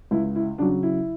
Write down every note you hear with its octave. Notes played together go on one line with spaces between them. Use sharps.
C#2 E4
E4
C#3 F#3 D4
E4